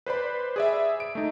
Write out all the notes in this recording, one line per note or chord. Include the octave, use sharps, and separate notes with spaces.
B4 C5 D5 B5
G#4 D5 E5
D7
A3 D#4